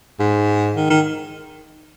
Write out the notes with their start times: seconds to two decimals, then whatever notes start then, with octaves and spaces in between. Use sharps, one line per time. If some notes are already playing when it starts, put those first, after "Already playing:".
0.20 G#2
0.76 D#3
0.90 D#3